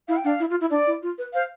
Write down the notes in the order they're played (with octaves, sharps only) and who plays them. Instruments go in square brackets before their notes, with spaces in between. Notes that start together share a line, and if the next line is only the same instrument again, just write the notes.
[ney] E4 [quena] F5
[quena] G5
[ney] D4 [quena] F5
[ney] E4
F4
E4
[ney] D4 [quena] D5
[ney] E4
F4
B4
[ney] C5 [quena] F5